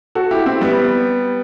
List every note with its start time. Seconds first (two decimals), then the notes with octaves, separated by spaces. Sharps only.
0.15 F#4 A4
0.31 E4 G4
0.46 C4 E4
0.61 G3 B3